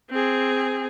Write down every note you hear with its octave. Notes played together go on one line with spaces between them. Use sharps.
C4 G#4